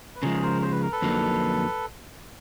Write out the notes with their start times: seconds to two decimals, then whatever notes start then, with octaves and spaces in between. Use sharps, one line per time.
0.15 B4
0.23 C#3 F3 G#3 G#4 A#4
0.42 A#4 C5
0.62 C5
0.72 B4
0.82 A#4
0.92 A4 B4
1.02 F2 D3 F#3 A#3 D#4